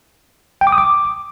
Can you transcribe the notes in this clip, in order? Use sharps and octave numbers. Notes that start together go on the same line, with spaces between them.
G5
D6
D#6
D6